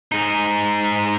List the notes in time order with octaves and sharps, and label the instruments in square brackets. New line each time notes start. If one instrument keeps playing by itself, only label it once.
[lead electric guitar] G#2 D#4